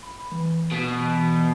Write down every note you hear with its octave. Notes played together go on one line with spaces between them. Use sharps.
B5
E3
B2